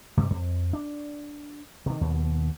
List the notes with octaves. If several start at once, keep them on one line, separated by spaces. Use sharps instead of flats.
G2 C3 G3
F2
D4
C3 D#3
D#2 B2